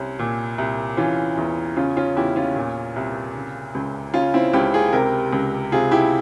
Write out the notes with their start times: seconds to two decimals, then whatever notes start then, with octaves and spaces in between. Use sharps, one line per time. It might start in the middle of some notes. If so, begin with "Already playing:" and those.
Already playing: C2 C#4
0.19 A#2
0.58 C2
0.97 E3 C#4 F4
1.37 E2
1.76 C#3 C#4 F4
1.97 C#4 F4
2.17 E2 E4 G4
2.36 C#4 F4
2.56 A#2
2.96 C2
3.35 C#3
3.75 C#2
4.14 C#3 C#4 F4
4.34 C4 E4
4.53 C#2 E4 G4
4.74 F4 G#4
4.93 C3 G4 A#4
5.33 C#2
5.72 C3 F4 G#4
5.91 E4 G4